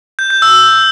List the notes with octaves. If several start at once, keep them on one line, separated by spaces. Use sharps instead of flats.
G6
G6
E6